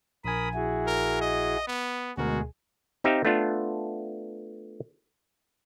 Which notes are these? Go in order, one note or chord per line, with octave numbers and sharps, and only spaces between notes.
A#1 A#4 G#5 B5 D#6
E4 F#4 G#4
A#4
D#5
B3
D2 B2 G#3 F#4 G#4 A#4
C4 D#4 G4 E5 F5
A3 B3 D4 F4